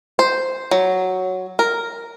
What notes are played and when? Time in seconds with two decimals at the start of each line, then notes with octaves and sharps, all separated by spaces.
0.19 C5
0.71 F#3
1.59 A#4